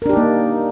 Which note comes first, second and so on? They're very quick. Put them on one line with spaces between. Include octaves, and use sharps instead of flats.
A#4 D4 G4 D#4 A#3